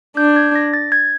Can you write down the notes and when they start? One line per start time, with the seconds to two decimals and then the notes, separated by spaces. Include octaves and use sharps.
0.17 D4 G6
0.36 G#6
0.55 A#6
0.74 A6
0.92 G#6